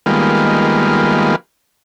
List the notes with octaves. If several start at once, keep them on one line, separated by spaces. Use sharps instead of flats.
D#3 G3 G#3 A#3 B3 F4